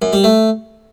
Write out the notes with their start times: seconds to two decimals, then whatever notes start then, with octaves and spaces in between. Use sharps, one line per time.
0.02 F#2
0.13 G3
0.24 A3